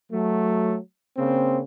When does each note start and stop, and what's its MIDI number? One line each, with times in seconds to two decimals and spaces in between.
0.12 0.78 54
0.12 0.78 57
1.17 1.60 49
1.17 1.60 58
1.17 1.60 60